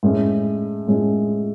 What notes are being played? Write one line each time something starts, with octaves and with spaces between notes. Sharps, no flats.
A2 G#3 C#4
A2 G#3 C#4